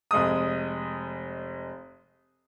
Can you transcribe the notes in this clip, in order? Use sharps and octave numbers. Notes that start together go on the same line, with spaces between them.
F1 G#3 D#6